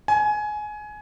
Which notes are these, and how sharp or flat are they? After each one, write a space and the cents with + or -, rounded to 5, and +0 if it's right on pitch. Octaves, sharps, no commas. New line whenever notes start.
G#5 +20